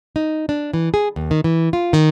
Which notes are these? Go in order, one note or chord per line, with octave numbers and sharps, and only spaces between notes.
D#4
D4
E3
G#4
D#2
D#3
E3
F4
D#3